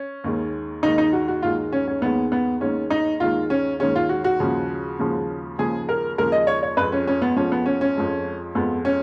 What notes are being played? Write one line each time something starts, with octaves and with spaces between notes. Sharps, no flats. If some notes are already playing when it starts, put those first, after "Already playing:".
Already playing: C#4
D#2 D#3 G#3
D#2 D#3 G#3 D#4
D#4
F#4
F#4
D#2 D#3 G#3 F4
C#4
C#4
D#2 D#3 G#3 B3
B3
D#2 D#3 G#3 C#4
D#4
D#2 D#3 G#3 F4
C#4
D#2 D#3 G#3 C#4
F4
F#4
F#4
D#2 C#3 F3 G#3
D#2 C#3 F3 G#3
D#2 C#3 F3 G#3 G#4
A#4
D#2 C#3 F3 G#3 A#4
D#5
C#5
C#5
F2 F3 G#3 B4
C#4
C#4
B3
F2 F3 G#3 C#4
B3
C#4
C#4
F2 F3 G#3
F2 F3 G#3 B3
C#4